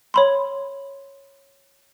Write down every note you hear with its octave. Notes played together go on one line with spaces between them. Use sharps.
C#5 B5 C6